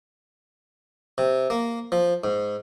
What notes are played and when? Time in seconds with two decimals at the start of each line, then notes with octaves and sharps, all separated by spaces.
1.18 C3
1.50 A#3
1.92 F3
2.24 G#2